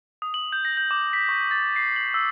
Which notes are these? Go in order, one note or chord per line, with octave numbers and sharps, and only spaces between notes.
D#6
F#7
G6
A#6
G6
D6
B6
C#6
A6
C7
F#7
E6